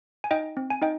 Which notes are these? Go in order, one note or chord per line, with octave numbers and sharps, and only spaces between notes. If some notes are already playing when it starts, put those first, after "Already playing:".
G#5
D#4 D#5 G5
C4
G#5
D#4 D#5 G5